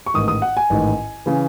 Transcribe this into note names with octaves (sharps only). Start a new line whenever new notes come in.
C#6
A1 G#2 D#3 D#6
D#6
F#5
G#5
A1 G#2 D#3
C#3 E3